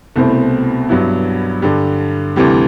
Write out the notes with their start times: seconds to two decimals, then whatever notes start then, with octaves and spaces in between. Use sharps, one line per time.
0.16 C2 B2 A3 C4 E4
0.89 G2 F#3 B3 E4
1.62 G2 D3 G3
2.36 D2 C3 E3 G3